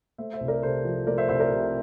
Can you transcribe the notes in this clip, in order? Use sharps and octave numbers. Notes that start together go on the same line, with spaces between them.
A3 C5 E5
C5 E5
C2
A#4 D5
C3 A4 C5
F3
A3 A#4 D5
C5 E5
C2 C5 E5
A#4 D5
C3